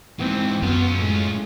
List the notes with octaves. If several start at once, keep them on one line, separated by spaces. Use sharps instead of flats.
G#2 E3 C4
F#2 B3 C#4 F4
A2 G#3